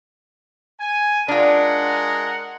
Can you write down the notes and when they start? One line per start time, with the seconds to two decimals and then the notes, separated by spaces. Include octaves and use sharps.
0.79 G#5
1.28 G#3 D4 F4 A#4 F#5